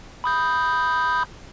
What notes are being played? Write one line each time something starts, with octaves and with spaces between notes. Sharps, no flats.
B5 D#6 G6